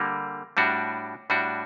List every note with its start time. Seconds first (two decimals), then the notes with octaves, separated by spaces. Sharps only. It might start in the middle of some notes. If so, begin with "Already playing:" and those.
Already playing: D3 G3 A#3
0.57 A2 G3 D4 F#4
1.30 A2 G3 D4 F#4